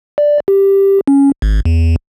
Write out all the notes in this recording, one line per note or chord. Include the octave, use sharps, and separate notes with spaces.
D5
G4
C#4
G#1
E2